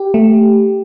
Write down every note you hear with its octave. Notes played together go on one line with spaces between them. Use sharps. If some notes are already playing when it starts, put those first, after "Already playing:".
Already playing: G4
A3